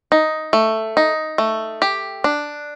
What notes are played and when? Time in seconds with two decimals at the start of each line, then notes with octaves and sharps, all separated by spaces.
0.12 D#4
0.53 A3
0.97 D#4
1.38 A3
1.82 G4
2.24 D4